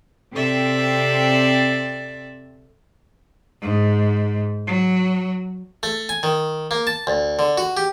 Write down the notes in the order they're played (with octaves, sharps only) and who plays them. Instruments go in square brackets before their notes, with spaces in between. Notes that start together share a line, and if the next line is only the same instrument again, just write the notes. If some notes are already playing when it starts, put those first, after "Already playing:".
[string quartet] C3 C4 A4 D5 E5
[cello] G#2
F#3
[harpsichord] A3
G#5
D#3
A#3
A5
D2
D3
F#4
G4